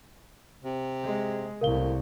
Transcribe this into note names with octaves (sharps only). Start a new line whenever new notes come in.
C3
G#3
C2 A2 A#4 F5 G7